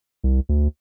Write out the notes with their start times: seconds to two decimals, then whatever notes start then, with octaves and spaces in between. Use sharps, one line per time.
0.24 C2
0.49 D2